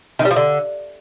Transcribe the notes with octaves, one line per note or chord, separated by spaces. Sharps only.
D#3
G3
F3
D3